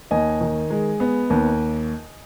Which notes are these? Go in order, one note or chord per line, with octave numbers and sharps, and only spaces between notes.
D#2 D#5 G#5
D#3
G#3
B3
D#2